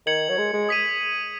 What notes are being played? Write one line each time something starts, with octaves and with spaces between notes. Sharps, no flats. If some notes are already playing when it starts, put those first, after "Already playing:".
D#3 G#6 C#7 F#7
F#3
G#3
G#3
D#6 B6 D#7